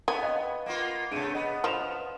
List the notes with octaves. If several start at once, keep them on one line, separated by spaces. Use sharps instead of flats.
B3 G#5
D#5 F5 G5
A#3 B3 F4
C3 A3 D4 G#4 D7 D#7
B3 D#5 B5
F3 F6 E7 F7